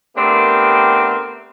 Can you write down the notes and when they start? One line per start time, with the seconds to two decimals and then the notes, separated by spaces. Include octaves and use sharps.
0.17 A3 B3 C4 D4 G4 A#4